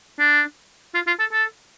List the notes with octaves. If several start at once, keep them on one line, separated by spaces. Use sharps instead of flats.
D4
F4
F4
A4
A4